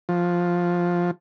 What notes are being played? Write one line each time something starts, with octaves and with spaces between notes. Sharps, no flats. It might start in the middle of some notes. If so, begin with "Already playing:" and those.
F3